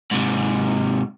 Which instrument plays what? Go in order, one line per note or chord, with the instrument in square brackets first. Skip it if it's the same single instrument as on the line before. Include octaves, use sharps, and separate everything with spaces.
[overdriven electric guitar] G#2 C3